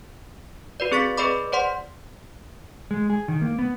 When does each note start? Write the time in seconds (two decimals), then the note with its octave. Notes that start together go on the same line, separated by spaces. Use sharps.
0.80 F#4 B4 D5
0.92 C4 G#4 C#6 A6 B6
1.17 G#4 B4 D5 D#5 B5 D6
1.52 C5 D5 F#5 C6
2.91 G#3
3.10 G#4
3.28 D#3
3.41 A#3
3.59 B3